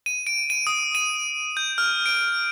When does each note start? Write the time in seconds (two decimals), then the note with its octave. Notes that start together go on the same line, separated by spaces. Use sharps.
0.06 D#7
0.27 D7
0.50 D#7
0.67 D#6
0.95 D#7
1.57 G6
1.78 F6
2.06 D7